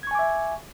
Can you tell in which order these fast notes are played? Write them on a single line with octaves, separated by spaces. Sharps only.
G#6 C#6 G#5 D6 E5